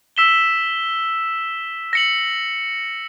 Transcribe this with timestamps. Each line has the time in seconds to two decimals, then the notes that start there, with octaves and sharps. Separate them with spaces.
0.17 E6 B6 E7 G7
1.93 A#6 C#7 F#7